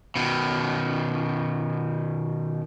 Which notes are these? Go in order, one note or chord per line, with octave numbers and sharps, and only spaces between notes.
B2 D#3